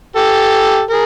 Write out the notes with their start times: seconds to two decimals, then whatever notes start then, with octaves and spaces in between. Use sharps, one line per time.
0.16 G4 A4
0.90 G#4 A#4